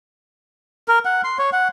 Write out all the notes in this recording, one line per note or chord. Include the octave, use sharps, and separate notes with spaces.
A#4
F#5
C6
C#5
F#5